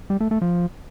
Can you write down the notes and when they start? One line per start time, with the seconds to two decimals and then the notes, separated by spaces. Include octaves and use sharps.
0.10 G3
0.20 A3
0.31 A3
0.42 F3